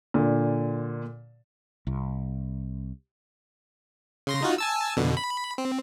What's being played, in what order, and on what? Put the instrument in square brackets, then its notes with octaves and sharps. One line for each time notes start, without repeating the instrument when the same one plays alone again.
[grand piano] A#2 D3
[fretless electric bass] C2
[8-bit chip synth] C#3 C6 A#6
D#4 F4 F#4
G#5 A5 E6
F2 B2 D3
B5
C4